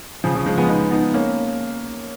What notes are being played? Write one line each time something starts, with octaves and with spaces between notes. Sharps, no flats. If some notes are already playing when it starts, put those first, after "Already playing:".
C#3 F3
C#3 F3
F3 G#3
G#3 B3
B3 D#4
B3 D#4
A#3 C#4